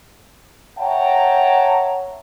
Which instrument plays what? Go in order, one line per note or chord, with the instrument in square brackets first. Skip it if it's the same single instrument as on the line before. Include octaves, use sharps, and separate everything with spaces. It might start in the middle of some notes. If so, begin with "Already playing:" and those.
[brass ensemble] C#5 E5 F#5 G5 A5 A#5